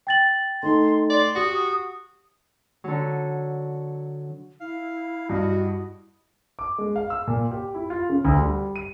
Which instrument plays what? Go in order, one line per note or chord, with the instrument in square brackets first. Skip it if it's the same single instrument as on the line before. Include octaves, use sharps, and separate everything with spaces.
[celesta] G5 A6 F#7
[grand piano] A3 D#4 [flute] C6
[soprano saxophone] D5 [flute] C6
[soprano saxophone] F#4 [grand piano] G4 [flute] D#6
[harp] D3 F#3
[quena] E4 [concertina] F5
[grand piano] G2 [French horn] F#4 [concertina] D#5
[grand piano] D6
G#3
F5
E6
A#2
G4
E4
F4
C#3
D2
G3
D#7